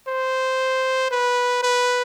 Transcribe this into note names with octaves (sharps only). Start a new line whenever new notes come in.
C5
B4
B4